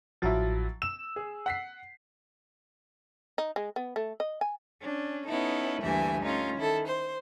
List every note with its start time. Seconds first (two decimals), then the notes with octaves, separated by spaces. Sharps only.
0.22 A1 F3 F#3 E4 F#4 A6
0.82 E6 E7
1.16 G#4
1.46 F#5 B6 C7
3.38 D#4
3.56 G#3
3.76 B3
3.96 A3
4.20 D#5
4.41 G#5
4.81 C#4 D4
5.27 B3 C#4 D#4 E4 A4
5.83 D2 G2 E3 A#3 E5 G#5
6.23 A3 C#4 D#4 F4
6.58 D#3 E4 A4
6.86 C5